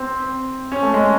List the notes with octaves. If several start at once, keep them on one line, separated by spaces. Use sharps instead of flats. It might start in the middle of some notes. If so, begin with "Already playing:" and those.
Already playing: C4
C#4
A3
G#3